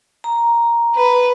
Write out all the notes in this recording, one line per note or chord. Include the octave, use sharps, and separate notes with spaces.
A#5
B4